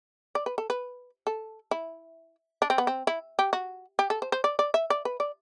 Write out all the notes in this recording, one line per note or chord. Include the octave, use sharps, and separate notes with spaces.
D5
B4
A4
B4
A4
E4
D4
C4
B3
C4
E4
G4
F#4
G4
A4
C5
C5
D5
D5
E5
D5
B4
D5